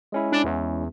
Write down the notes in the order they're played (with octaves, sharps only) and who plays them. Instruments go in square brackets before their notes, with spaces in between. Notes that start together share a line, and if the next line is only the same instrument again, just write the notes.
[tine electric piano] G#3 C#4 E4
[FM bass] D4
E2